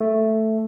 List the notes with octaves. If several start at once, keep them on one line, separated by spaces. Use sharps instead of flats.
A3